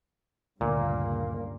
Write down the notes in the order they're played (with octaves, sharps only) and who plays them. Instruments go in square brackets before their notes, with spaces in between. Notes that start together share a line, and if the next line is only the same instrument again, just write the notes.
[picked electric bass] D2 [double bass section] G2 C#3 A#3 [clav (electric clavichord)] A#2